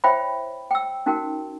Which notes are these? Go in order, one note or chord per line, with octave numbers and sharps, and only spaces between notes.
E4 C5 C#5 E5 G5 B5
G5 E6
C#4 D#4 F#4 A#4 G5